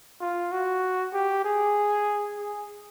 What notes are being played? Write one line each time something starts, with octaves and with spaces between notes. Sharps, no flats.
F4
F#4
G4
G#4
G#4